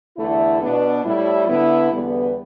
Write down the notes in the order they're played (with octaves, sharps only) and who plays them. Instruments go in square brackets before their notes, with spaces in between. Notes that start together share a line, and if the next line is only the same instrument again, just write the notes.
[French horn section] E2 D3 A3 E4
B2 B3 D4
A2 G3 E4
D3 B3 E4
E2 D3 G3 B3